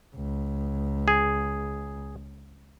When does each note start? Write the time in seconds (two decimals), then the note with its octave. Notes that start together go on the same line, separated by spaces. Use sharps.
0.15 C#2
1.08 G#4